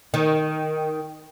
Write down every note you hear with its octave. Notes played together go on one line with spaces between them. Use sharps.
D#3